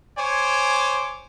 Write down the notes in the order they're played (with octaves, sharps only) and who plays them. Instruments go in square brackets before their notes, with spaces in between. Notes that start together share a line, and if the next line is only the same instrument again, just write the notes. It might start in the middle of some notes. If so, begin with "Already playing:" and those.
[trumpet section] C5 C#5 G#5 D6